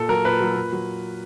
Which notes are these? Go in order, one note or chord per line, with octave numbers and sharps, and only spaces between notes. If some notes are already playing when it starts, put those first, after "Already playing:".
Already playing: A#2 A4
F#3 A#4
A#2 B4
F#3
A#2
F#3